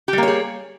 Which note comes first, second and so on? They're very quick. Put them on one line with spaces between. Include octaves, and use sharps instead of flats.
G4 G3 A#3 C#5 G#4